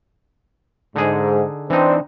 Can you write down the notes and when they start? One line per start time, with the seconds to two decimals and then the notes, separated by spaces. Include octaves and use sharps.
0.96 G#2 D3 D#4 G#4
1.70 E3 C4 D4 D#4